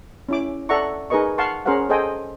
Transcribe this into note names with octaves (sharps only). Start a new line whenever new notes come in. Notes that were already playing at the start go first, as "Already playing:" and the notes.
C#4 E4 D6
A4 D5 E5 F#5 A#5 C#6
D#4 G#4 A#4 B4 D#5 C#6
F5 F#5 A5 C6 C#6
C#4 G#4 A#4 C5 F5 F#5
G#4 A4 C5 D#5 G5 G#5